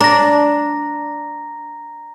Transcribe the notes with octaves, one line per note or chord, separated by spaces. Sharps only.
D4 A#5 A#6